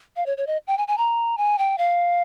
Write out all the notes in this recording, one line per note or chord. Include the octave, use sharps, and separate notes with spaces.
F5
C#5
C#5
D#5
G5
G#5
G#5
A#5
G#5
G5
F5